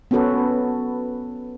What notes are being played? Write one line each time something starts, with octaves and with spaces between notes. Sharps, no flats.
B3 C#4 F#4 A4 B4